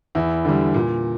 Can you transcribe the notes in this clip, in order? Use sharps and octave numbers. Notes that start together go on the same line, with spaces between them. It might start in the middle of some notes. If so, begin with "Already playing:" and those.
E2 E4
D3 G3
A#2